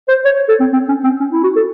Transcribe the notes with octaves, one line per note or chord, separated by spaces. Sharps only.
C5
C#5
A4
C4
C4
C#4
C4
C#4
E4
F#4
A4